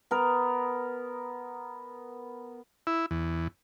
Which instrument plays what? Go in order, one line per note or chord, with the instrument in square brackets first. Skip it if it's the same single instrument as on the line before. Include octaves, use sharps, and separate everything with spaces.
[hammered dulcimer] B3 A#4
[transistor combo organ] E4
E2